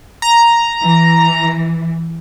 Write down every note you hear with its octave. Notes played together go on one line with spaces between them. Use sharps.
A#5
E3